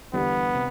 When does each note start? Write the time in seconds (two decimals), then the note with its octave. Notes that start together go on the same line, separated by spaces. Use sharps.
0.13 E2 D3 G3 B3 D4 G4
0.55 C3